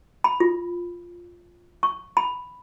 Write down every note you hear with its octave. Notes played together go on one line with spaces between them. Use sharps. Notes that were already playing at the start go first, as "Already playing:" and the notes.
B5
F4
C#6
B5